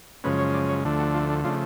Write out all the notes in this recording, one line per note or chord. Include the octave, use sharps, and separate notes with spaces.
F#2 C#3 F3 G#3 C#4 B4
C#5
D5
C#5
D2 D3 F3 A3 D4
F#4
F4
D4
C#3 F3 A3 D4 F4